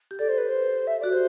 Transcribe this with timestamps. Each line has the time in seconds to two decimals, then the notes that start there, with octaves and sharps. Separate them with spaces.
0.11 G4
0.19 A4 D5
0.29 C5
0.38 B4
0.48 C5
0.87 E5
1.00 F#4 D5
1.12 G4 C5